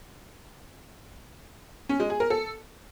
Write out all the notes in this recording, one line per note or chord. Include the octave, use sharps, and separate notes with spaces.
C#4
G#3
G#4
A#4
A4